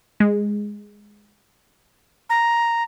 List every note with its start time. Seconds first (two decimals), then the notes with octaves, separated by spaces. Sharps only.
0.20 G#3
2.30 A#5